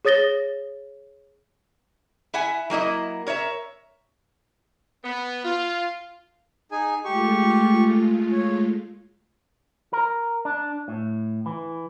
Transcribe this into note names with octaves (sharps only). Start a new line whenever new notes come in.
G#4 C#5 D#6 A6 A#6 G7
E4 E5 F#5 G#5
F#3 A#3 E4 D#5
A#4 C#5 D5 E5
B3
F4
D#4 G#4 G#5
G#3 A3 F4 G4 C#6
C#5
A#4
D4
A2
E3